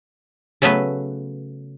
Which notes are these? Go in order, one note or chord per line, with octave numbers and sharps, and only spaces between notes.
C#3 F#3 A3 B3 B4